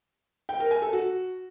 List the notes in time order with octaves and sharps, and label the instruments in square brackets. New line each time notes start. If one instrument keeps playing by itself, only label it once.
[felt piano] G5
A#4
G#5
A4
F#4